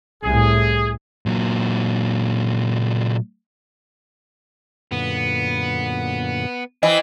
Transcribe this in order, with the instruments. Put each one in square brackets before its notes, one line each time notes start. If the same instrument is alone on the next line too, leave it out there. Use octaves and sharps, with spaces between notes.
[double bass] C2 A2 [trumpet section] G#4
[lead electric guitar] A#2 F#3
[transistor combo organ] F#2 A#2 D3 [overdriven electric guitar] B3
[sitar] E3 [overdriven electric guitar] C4 [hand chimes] D#5